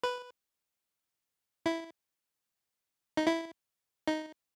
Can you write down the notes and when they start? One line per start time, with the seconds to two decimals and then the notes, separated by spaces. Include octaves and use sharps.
0.03 B4
1.66 E4
3.17 D#4
3.27 E4
4.07 D#4